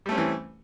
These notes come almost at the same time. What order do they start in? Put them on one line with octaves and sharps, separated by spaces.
G3 A3 C#4 C4 E3